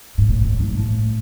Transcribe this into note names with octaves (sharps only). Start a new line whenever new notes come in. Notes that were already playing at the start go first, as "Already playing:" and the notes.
G#2
A2
A2
G#2
G#2
A2